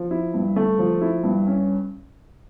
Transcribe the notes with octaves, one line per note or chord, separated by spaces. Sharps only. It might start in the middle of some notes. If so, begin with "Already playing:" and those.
Already playing: F3
E4
G2
A3
F3
E4
G2
C#4